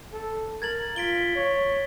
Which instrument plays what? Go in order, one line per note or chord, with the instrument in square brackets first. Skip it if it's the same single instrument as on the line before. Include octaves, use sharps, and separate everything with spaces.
[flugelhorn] A4
[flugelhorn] A#4 [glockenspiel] G#6 A6 F#7
[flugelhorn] F4 [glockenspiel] B6 D7 G7
[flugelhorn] C#5